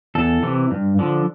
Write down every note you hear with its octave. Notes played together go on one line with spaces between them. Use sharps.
E2 A4
C3 E3
G2
D3 F3